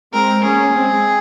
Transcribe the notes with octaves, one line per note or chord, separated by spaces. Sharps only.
G#3 C4 A#4
A#3 C#4 G#4
G#3 C4